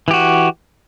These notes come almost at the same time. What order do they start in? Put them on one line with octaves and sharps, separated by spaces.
E3 G4 F#4